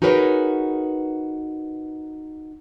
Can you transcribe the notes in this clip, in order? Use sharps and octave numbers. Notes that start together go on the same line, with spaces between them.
D#4 F#4 G#4 A#4 B4 C#5